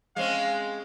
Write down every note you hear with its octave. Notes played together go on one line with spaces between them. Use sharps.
G#3 C4 C#4 F5